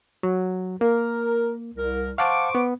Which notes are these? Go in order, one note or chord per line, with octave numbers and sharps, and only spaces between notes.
F#3
A#3 A#4
C2 A#4
C5 F5 F#5 A5 C#6 D6
B3